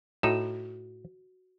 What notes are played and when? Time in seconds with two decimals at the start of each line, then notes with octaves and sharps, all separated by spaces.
0.23 A2 D#4 F#4